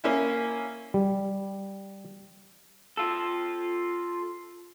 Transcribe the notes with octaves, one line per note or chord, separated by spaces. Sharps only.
A#3 C#4 E4
G3
F4 A4